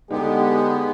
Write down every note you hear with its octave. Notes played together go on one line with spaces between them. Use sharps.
D3 G#3 B3 D#4 G4